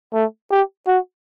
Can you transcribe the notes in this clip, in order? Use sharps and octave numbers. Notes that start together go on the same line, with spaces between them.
A3
G4
F#4